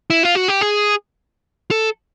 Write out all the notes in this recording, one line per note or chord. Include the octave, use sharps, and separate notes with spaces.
E4
F4
F#4
G4
G#4
A4